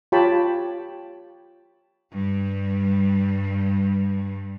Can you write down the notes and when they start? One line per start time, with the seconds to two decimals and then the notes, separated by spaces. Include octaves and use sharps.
0.12 F4 G4 C#5 G5 A5 B5
2.11 G2 G3